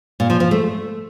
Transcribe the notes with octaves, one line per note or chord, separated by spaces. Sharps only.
A#2
F3
F3
A3